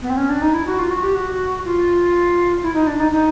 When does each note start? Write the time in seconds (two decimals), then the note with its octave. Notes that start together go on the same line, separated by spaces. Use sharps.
0.02 B3
0.10 C4
0.17 C#4
0.29 D4
0.42 D#4
0.54 E4
0.67 F#4
0.79 F4
0.91 F#4
1.03 G4
1.15 F#4
1.65 F4
2.63 E4
2.75 D#4
2.87 D4
3.00 D#4
3.12 D#4